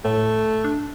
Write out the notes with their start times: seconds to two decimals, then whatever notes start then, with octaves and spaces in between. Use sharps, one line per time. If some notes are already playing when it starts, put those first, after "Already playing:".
0.05 A2 A3
0.64 D4